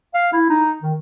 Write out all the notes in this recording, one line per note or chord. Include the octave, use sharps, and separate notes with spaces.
F5
E4
D#4
D#3